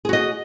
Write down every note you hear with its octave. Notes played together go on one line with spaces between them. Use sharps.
F#4 G#4 D#5